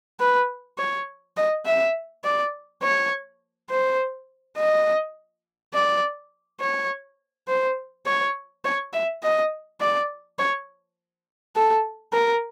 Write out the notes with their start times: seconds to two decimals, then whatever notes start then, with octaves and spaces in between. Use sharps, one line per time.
0.20 B4
0.78 C#5
1.37 D#5
1.66 E5
2.24 D5
2.83 C#5
3.70 C5
4.57 D#5
5.74 D5
6.61 C#5
7.48 C5
8.07 C#5
8.65 C#5
8.93 E5
9.23 D#5
9.81 D5
10.39 C#5
11.56 A4
12.13 A#4